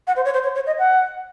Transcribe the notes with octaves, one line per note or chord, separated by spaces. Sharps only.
F#5
C5
C#5
C5
C#5
C#5
D#5
F#5